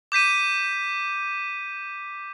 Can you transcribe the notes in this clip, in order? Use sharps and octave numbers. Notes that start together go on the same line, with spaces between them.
D6 G6 B6 D#7